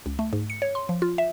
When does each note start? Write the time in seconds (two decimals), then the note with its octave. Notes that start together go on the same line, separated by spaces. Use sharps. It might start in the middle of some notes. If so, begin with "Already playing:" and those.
0.06 C#2
0.19 A3
0.33 G#2
0.50 C#7
0.62 C#5
0.75 C6
0.89 F3
1.02 F4
1.18 E5